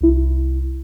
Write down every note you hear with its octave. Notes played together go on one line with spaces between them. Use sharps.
C2 E4